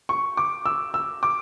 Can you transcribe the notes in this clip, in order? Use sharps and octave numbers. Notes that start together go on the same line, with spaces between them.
C#6
D6
E6
E6
D6